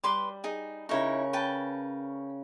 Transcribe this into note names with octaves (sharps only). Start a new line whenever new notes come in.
G3 B4 C6 D6
D#4 G#4
C#3 D#4 E4 A#4 C#5 C#6
B4 G5 A5